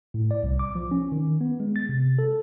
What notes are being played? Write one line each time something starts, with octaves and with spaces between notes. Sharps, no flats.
A2
D5
C2
D6
F3
C#4
D#3
B3
G#3
A6
C3
A4